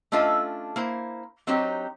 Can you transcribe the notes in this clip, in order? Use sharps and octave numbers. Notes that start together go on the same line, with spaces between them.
A3 C#4 D4 F4 A4 D#5
A#3 E4 C5
F#3 C4 D4 D#4 G4 C#5